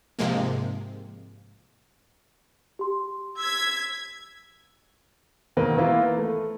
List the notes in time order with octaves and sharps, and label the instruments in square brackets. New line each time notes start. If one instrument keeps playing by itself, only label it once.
[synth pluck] G#2 C3 F3 G#3 A#3
[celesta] G4 C6
[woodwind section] E6 [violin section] G#6 B6
[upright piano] E1 D#3 A#3 B4
E3 A#3 B3 E4 F4
A3